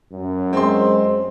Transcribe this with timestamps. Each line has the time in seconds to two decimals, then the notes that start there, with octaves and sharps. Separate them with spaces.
0.12 F#2
0.53 G#3 C4 C6